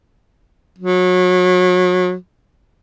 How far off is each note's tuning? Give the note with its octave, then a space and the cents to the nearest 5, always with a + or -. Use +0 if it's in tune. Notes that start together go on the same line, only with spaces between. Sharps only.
F#3 -30